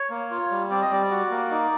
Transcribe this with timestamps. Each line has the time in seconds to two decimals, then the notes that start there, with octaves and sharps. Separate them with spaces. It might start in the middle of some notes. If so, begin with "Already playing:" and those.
Already playing: C#5
0.10 A#3
0.31 F4
0.51 G3
0.70 C4 D5
0.81 D#5
0.91 G3 D5
1.11 F#4
1.31 A#3
1.50 D#4